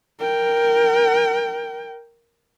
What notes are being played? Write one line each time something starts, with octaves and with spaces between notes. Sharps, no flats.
A#4 G5